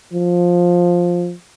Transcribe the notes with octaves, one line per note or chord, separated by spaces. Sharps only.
F3